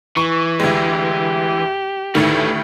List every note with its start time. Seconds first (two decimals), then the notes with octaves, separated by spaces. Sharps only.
0.17 E3 C#6
0.60 D2 G#3 G4
2.15 D2 A2 D#3 E3 A3